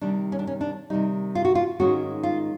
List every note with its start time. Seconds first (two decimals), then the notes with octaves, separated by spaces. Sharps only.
0.01 C3 D#3 G3 D4
0.32 C#4
0.39 D4
0.47 C#4
0.61 D4
0.90 C3 D#3 G3 D#4
1.35 F4
1.45 F#4
1.55 F4
1.79 G#2 D#3 G#3 C#4 F#4
2.23 F4